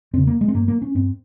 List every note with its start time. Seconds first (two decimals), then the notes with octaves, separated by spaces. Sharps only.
0.13 E2 C#3 C4
0.27 A#3
0.41 G#3
0.48 C4
0.54 G2 A#3
0.68 A#3
0.82 C#4
0.95 G2 C4